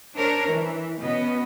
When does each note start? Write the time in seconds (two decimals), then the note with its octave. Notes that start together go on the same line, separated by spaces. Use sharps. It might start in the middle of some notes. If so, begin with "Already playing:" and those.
0.18 D4 A#4 C5 C#5
0.50 E3
1.00 B2 B3 C#4 D#5